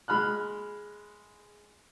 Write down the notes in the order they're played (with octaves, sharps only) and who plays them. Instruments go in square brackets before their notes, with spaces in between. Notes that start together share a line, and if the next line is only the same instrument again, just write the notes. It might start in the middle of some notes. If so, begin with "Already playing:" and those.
[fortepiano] G#3 B5 F6 F#6